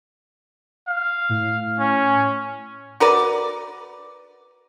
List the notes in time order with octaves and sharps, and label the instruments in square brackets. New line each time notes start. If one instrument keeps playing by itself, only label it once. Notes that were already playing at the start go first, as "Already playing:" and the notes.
[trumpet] F5
[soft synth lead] A2
[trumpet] C#4
[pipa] F#4 A#4 B4 D5